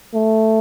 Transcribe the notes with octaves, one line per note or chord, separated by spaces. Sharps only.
A3